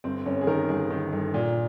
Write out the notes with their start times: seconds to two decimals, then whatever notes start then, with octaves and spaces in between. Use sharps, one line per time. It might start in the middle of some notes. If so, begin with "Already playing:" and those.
0.04 G1 C4
0.26 G1 C#4
0.41 G#4
0.47 D#3 A#4
0.69 G1 G#4
0.90 D#3
1.13 G1
1.34 A#2